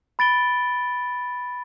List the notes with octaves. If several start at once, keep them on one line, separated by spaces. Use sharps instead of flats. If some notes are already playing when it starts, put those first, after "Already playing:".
B5 A6 D7 G7